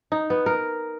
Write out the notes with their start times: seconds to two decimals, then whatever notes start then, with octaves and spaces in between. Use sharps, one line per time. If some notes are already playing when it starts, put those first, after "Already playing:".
0.12 D#4
0.30 B3
0.46 A#4